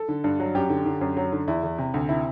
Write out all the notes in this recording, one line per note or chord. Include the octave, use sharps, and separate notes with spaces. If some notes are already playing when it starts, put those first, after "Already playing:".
Already playing: A4
D3
G2
F#3
F#2 G4
D3
D3
F#2
F#3
D3
E2 E4
E2
C3
D2
C3 E4